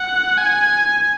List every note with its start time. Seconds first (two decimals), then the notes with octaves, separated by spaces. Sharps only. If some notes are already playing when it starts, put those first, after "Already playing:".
Already playing: F#5
0.37 G#5